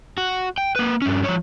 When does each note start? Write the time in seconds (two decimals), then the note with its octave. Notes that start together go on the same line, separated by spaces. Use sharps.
0.18 F#4
0.58 G5
0.76 A#3 B4
1.02 G2 C#4
1.24 F3 C#5